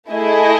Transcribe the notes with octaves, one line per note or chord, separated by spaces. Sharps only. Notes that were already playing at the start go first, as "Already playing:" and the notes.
A3 E4 G#4 D#5